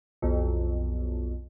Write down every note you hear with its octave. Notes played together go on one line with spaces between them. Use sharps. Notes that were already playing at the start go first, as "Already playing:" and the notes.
B1 F2